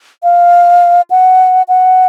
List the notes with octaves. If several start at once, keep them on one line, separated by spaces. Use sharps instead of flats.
F5
F#5
F#5